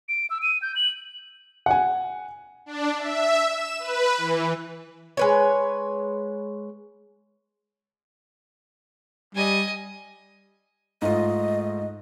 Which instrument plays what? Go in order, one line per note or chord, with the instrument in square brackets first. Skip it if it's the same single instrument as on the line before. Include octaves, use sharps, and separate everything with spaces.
[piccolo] D7
E6
D#7
G6
F#7
[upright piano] F#5 G#5
[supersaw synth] D4
E5
E7
B4
E3
[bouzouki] G#3 B4 C#5
[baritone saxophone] G3 [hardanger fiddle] D#5 G#5
[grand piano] G#2 A3 F4 [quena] D#5